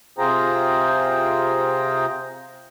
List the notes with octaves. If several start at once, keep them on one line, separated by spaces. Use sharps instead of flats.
C3 F4 G#4 C5 G5 A#5